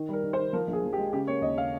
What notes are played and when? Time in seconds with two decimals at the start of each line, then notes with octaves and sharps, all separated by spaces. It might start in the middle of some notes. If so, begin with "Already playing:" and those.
Already playing: D#3
0.09 G3 A#4
0.23 D#3
0.33 C5
0.39 D#3
0.53 F3 A#4
0.68 A#1
0.73 G#4
0.83 F3
0.93 G4
0.98 G#3
1.13 C#3 G4
1.27 A#3 C#5
1.42 D#2 D#5
1.57 C#3 F5